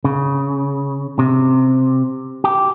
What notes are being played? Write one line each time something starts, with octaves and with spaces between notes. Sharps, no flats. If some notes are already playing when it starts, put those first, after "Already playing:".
C#3
C3
G4